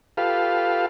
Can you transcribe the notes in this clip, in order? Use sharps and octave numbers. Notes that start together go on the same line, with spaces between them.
F4 G4 A4 B4 F5